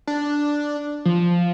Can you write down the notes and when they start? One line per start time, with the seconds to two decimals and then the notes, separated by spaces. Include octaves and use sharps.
0.07 D4
1.05 F3